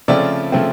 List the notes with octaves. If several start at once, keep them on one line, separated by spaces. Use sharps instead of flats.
C#3 F3 A3 C4 D5 E5
C#3 F3 A3 C4